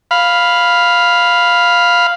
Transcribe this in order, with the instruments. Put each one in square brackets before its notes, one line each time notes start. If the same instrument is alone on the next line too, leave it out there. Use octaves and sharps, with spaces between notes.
[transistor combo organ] F5 B5